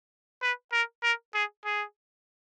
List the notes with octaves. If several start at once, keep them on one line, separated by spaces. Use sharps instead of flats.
B4
A#4
A#4
G#4
G#4